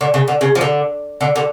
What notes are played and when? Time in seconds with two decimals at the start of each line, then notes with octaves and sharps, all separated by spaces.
0.01 D3
0.14 C#3
0.28 D3
0.41 C#3
0.55 F3
0.61 D3
1.21 D3
1.36 D3